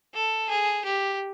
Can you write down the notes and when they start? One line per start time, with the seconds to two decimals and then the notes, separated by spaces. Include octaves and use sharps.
0.14 A4
0.49 G#4
0.85 G4